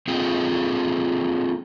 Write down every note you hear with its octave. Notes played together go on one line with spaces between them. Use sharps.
A#3 C4 F4 G#4 A4 G5